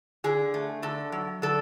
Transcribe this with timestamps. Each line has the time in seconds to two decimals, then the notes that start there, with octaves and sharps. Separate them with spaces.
0.24 D3 G#4
0.54 A3
0.82 D3 A4
1.12 F#3
1.42 D3 A4